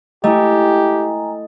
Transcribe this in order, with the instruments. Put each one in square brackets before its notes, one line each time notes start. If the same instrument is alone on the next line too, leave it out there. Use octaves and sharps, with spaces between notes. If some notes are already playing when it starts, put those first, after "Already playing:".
[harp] A3 E4 [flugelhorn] G4 [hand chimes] D#5 [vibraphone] G5 G#5 A#5